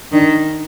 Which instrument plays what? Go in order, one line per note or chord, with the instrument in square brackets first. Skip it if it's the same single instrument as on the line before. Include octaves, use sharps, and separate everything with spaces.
[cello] D#3 [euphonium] D4